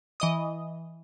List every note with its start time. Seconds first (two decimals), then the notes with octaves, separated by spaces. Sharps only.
0.20 E3 D#5 D#6